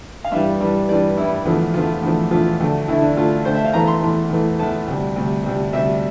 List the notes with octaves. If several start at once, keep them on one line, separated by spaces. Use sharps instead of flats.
F5
G2 E3 G3 E5
G2 E3 G3
G2 E3 G3 D5
G2 E3 G3 E4
E2 D3 F3 A3
E2 D3 F3 A3 F4
E2 D3 F3 A3
E2 D3 F3 A3 F4
D2 D3 A3
D2 D3 A3 E4
D4
D2 D3 A3 F4
D2 D3 A3 C5
E5
F5
E2 E3 A3 A#5
C6
E2 E3 A3
E2 E3 A3
E2 E3 A3 A5
D2 C3 G3
D2 C3 G3
D2 C3 G3
D2 C3 G3 E5